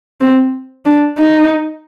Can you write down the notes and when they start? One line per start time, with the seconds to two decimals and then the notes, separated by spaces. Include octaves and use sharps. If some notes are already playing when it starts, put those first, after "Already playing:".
0.21 C4
0.85 D4
1.18 D#4